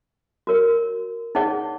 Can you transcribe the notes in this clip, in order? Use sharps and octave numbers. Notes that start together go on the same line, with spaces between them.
F#4 A#4 C#5
D#4 G#4 C#5 F#5